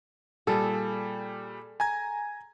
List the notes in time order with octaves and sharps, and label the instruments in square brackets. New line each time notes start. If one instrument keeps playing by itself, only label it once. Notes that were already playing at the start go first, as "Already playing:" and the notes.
[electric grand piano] A#2 G3 [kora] G#4 A4
[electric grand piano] G#5 A#5 G#6